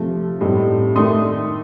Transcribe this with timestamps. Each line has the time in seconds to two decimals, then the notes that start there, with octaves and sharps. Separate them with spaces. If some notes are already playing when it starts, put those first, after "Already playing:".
Already playing: C3 F3 A3
0.41 A2 G3 C4 D#4
0.95 D#3 A3 D4 C6 D#6